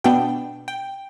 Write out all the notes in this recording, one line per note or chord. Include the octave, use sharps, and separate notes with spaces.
B2 B3 D4 G5
G5